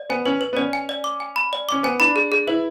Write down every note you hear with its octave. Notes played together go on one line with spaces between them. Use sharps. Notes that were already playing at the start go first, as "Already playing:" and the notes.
Already playing: D5
B3 G#5
C#4 B4
B4
B3
C#4 D5
G#5
D5
D6
G#5
B5
D5
C#4 D6
B3 G#5
D4 B5
G#4
G#4
E4 B4